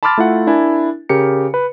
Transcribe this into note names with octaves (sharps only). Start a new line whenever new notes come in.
A5 B5 C6 D6 F6 A6
A3 E4 F4 F#5
D4 E4 A#4 G#5
C#3 G4 A#4 C#7
B4